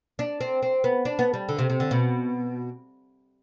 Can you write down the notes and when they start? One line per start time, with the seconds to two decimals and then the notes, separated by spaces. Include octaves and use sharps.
0.19 D4
0.41 C4
0.63 C4
0.84 B3
1.05 D4
1.19 B3
1.34 G3
1.49 D3
1.59 C3
1.70 C3
1.80 D3
1.91 B2